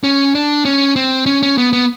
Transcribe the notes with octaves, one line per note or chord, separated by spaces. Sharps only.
C#4
D4
C#4
C4
C#4
C#4
B3
B3